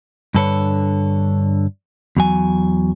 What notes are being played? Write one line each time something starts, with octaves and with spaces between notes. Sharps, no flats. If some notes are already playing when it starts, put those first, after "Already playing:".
G2 D3 A4 B4 C#5
E2 F#3 G#5